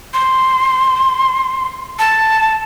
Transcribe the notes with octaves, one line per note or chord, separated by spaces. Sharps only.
C6
A5